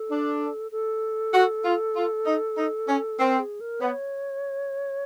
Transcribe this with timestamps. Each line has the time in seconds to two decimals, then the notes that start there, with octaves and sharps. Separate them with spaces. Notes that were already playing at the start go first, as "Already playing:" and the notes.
Already playing: A4
0.10 D4
0.71 A4
1.34 F#4
1.64 F4
1.96 F4
2.26 D#4
2.57 D#4
2.87 C#4
3.19 C4 A#4
3.39 G#4
3.60 A#4
3.81 B3 C#5